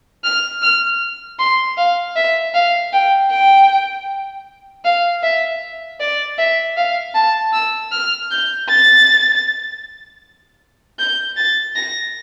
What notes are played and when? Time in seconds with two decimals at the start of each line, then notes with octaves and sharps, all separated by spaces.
0.24 F6
0.62 F6
1.39 C6
1.77 F5
2.16 E5
2.54 F5
2.93 G5
3.31 G5
4.85 F5
5.23 E5
6.00 D5
6.38 E5
6.77 F5
7.15 A5
7.53 E6
7.92 F6
8.31 G6
8.69 A6
10.99 G6
11.37 A6
11.76 A#6